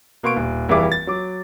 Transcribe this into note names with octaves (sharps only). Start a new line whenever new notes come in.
B2 A#3 B3 C6 C#6 D7
D#1
F1 E3 G3 G#4 E5 D6
A6
F#3 D6